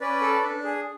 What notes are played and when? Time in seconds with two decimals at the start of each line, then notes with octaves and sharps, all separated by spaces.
0.01 C#4 B4 D5
0.21 A4
0.43 D4
0.64 G#4